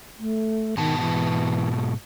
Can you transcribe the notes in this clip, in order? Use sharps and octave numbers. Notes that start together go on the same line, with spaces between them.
A3
G#2 B2 D#3 A5
E3